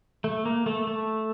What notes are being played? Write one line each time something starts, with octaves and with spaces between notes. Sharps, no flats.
A3
A#3
A3
A3